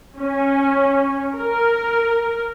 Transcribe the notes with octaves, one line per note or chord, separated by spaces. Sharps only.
C#4
A#4